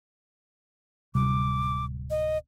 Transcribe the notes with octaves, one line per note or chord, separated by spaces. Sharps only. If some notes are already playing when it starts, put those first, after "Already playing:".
D1 C3 G3 D6
D#5